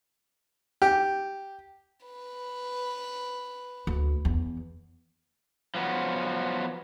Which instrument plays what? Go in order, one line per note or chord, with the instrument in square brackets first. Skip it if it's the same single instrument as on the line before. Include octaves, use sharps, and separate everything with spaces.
[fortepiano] G4
[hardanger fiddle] B4
[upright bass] D2
E2
[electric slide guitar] F3 F#3 B3